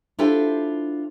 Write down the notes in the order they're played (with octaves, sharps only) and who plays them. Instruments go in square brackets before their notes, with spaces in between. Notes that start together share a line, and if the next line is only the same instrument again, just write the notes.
[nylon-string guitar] D4 E4 F4 G4 A4 C5